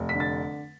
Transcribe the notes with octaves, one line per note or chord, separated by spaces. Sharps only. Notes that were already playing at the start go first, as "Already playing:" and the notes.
Already playing: F1
D3 B6
A6